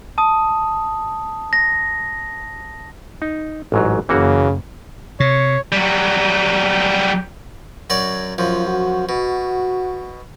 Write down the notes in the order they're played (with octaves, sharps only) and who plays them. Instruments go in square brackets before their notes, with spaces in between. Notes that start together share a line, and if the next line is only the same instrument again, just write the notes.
[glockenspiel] A5 D#6
A#6
[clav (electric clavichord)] D#4
A1 G#2 F#3
[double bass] F#1 [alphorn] C#3 [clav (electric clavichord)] E3 A#3 F#4
[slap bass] C3 [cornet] C#5
[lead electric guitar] F#3 G3
[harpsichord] F#2 F#3 D5
[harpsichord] F#2 F3 [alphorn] F4
[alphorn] F#4
[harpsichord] B2 [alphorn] F#4